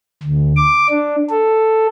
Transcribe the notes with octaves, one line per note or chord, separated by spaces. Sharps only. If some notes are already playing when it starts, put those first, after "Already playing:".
D2
D6
D4
A4